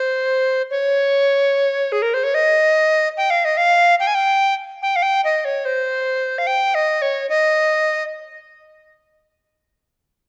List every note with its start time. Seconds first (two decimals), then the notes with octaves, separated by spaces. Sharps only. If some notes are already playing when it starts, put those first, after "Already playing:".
Already playing: C5
0.71 C#5
1.92 G#4
2.02 A#4
2.14 C5
2.24 C#5
2.34 D#5
3.17 G5
3.30 F5
3.45 D#5
3.57 F5
4.00 G5
4.07 G#5
4.15 G5
4.82 G5
4.96 F5
5.03 G5
5.24 D#5
5.45 C#5
5.65 C5
6.38 F5
6.47 G5
6.75 D#5
7.02 C#5
7.29 D#5